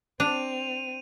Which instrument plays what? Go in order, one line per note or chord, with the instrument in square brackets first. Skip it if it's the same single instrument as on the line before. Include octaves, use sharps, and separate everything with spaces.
[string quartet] C4 [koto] D4 [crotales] D#7 F7